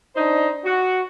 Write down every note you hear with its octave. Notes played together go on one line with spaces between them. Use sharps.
D4 D#4 C5 D#5
F#4